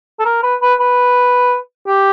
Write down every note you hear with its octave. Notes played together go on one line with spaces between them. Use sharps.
A4
A#4
B4
B4
B4
G4